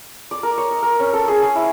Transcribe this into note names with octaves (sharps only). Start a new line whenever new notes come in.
D5
A#4
C#5
D#5
A#4
C#4
A4
G#4
G#4
E4